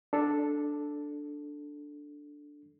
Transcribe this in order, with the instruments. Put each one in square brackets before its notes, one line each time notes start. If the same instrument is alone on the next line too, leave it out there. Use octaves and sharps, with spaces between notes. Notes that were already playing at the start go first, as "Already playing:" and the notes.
[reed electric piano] D4 A4